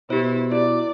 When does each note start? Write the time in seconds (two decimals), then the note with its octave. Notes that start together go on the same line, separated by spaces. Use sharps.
0.10 B2 E4 G4 C5
0.52 E4 D5